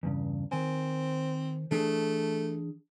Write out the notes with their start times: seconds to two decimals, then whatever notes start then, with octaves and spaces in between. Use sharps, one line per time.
0.03 E2 G2 C#3
0.51 D#3 C4 C5 G#5
1.71 E3 A3 D4 G#4